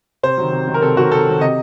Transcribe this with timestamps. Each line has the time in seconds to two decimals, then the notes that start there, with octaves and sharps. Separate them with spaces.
0.23 C3 C5
0.38 D#3 F#3
0.52 C3
0.68 D#3 F#3
0.74 A#4
0.82 C3 A4
0.97 D#3 F#3 F#4
1.11 C3 A4
1.27 D#3 F#3
1.41 C3 D#5